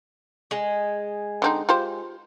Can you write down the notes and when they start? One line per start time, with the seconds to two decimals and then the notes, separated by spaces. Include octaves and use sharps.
0.51 G#3
1.42 D3 C4 D#4
1.69 F4 G4 C5